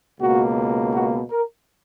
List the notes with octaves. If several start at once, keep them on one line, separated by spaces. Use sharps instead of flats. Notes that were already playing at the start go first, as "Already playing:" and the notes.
C#2 B2 A#3 F#4
F#4
A#4